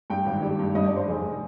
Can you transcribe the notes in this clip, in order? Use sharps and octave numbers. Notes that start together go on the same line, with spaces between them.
G2 G5
G#1
G3
G2
G2 D#5
D5
G2 C5
F1 G#4